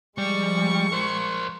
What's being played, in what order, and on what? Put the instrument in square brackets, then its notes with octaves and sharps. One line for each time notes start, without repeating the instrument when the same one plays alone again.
[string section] F3 G#3 [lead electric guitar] G3 [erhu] C#6
[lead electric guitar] A#4 C5